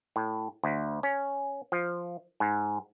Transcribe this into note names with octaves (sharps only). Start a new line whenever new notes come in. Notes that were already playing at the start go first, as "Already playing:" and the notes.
A2
D2
C#4
F3
G#2